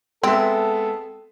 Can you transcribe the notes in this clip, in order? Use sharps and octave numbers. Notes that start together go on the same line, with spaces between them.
G#3 B3 C4 A4 E5